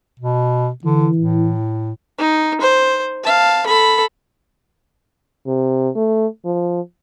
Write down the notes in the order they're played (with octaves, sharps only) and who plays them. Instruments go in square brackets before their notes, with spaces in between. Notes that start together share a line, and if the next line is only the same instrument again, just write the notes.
[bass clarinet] B2
[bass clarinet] D3 [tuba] E3
[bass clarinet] A2
[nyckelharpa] D#4
C5
F5 A5
A4 B5
[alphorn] C3
A3
F3